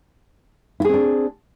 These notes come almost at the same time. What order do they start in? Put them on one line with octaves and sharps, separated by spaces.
E4 G#4 C4 D4